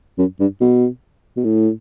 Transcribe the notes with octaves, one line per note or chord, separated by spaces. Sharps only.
F#2
G2
B2
B2
A2